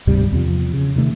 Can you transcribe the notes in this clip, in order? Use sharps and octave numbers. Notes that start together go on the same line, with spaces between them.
D2 G#2 C3 G3
E2 C3 F3
C#3
C3 D#3 A3